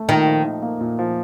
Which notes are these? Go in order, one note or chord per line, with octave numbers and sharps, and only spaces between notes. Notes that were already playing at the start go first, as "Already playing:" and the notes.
Already playing: A3
A#2 D#3
F3
D#4
A#3
A#2
F3